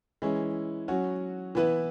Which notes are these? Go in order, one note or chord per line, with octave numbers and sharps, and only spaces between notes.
E3 G#3 C#4 E4
F#3 C#4 F#4
E3 B3 E4 B4